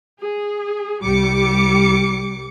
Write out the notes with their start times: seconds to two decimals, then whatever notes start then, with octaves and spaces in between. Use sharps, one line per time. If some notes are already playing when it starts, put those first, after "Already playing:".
0.21 G#4
1.03 C2 G3 D6 C#7